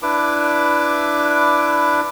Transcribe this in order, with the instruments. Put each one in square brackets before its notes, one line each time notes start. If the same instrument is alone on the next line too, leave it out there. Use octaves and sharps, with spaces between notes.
[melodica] D4 E4 B4 D6